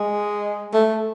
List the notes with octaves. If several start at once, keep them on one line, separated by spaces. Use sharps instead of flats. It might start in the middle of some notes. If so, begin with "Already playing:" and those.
Already playing: G#3
A3